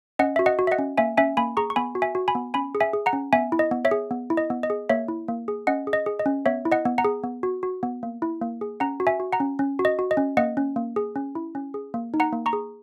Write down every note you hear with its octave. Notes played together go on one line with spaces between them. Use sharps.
C#4 D#5 F#5
F#4 E5
D#5 F#5
F#4
E5
D#5 F#5
C#4
A#3 E5 G#5
C#4 E5 G#5
A#3 G#5 B5
G#4 A#5 C#6
C#6
B3 G#5 B5
F#4
E5 G#5
F#4
G#5 B5
B3
C#4 G#5 B5
G#4
E5 G#5
G#4
F#5 A#5
C#4
B3 E5 G#5
E4
D#5
B3
C#5 E5
G#4
B3
E4
D#5
B3
D#5
G#4
A#3 C#5 E5
E4
A#3
G#4
C#4 D#5 F#5
G#4
D#5
G#4
D#5
C#4
B3 C#5 E5
E4
D#5 F#5
B3
F#5 A#5
G#4
B3
F#4
F#4
B3
A#3
E4
A#3
G#4
C#4 F#5 A#5
F#4
E5 G#5
F#4
F#5 A#5
C#4
C#4
F#4
D#5
F#4
D#5
C#4
A#3 D#5 F#5
C#4
A#3
G#4
C#4
E4
C#4
G#4
A#3
D#4
F#5 A#5
A#3
A#5 C#6
G#4